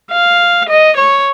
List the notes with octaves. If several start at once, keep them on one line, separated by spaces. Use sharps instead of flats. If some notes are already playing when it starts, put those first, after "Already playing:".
F5
D#5
C#5